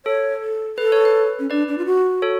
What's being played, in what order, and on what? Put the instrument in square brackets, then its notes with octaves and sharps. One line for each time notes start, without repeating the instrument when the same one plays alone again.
[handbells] A4 [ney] C#5
[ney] A4
[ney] A4 [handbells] B4
[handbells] C#5
B4
[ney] C#4
[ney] D4 [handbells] B4 D5
[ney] D4
F4
F#4
[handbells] A4 C#5